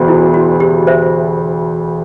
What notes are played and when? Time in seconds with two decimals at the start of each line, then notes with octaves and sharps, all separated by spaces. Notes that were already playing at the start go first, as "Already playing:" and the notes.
Already playing: E1 D2
0.08 E4
0.34 F#4
0.60 G4
0.87 C5 E5